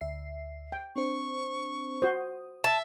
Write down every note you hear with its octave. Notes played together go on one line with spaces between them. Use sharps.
D2 E5 C7
G5
C4 D4 C5 C#6
F#4 C5 D#6
E5 A5